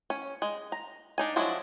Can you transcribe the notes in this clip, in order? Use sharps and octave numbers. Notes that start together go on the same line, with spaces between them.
C#4
G#3
A#5
D4 D#4 G#5
F3 F#3 G#3 D4 E4